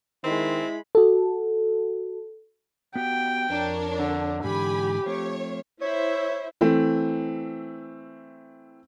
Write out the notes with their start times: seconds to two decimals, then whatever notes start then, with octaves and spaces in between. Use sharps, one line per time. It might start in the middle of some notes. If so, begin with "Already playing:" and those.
0.24 D#3 G#3 C4 E4 B5
0.95 F#4 A4
2.95 B3 F#4 G4 G5
3.49 F2 D4 A#4 C#5
3.96 D3
4.44 G#2 D3 E3 G4 G#5 B5
5.06 F3 A3 C4 C#5
5.82 E4 C5 C#5 E5
6.61 E3 A3 C4